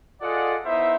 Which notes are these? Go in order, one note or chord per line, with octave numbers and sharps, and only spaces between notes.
F4 G#4 A4 D5 D#5 F#5
B3 D#4 E4 C5 E5